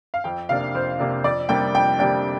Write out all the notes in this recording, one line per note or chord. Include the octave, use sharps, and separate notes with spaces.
F5
F2 G5
C3 A#3 D4 F5
F2 C5
C3 A#3 D4
F2 D5
C3 G3 A#3 D4 G5
F2 G5
C3 G3 A#3 D4 G5